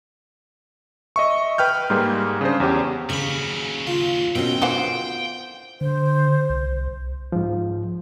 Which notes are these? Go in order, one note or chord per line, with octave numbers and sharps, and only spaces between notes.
D#5 E5 C#6
B4 G5 F6 G6
G#2 G3 A#3 G#4
C#3 D4 C5
E2 C#4 G4
D#2 C#3 F#3 B5 C#6
F4
B2 D#3 C4 C#4 G5
D3 E3 F4 C5 F#5
D3 C5
C2
G#2 F3